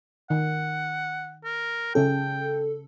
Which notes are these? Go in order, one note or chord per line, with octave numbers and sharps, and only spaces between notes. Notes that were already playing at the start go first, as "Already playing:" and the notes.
D#3 F#5
A#4
C#3 C#4 G#4 A4 G5